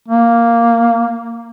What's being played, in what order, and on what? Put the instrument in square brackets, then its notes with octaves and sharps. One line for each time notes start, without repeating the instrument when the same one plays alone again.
[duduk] A#3